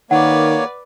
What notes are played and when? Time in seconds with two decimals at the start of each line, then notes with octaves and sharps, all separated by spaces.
0.11 D#3 A#3 B4 C#5 D5 F#5